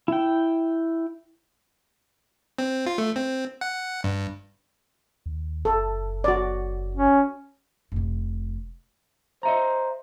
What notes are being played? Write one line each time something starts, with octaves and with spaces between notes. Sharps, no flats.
E4 G5
C4
F4
A3
C4
F#5
G2
D#2
F#1 A4
F#4 D5
C#4
F1 C3
C5 D#5 E5 A#5